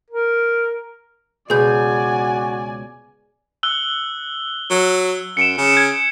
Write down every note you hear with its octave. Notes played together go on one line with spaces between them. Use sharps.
A#4
C#2 B2 F#4 G#4 B4 D5 G#5 G6
E6 F#6 G7
F#3
F#2 C#7 D7 E7
C#3
G#6